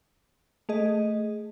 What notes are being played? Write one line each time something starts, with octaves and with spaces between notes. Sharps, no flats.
A3 G#4 D#5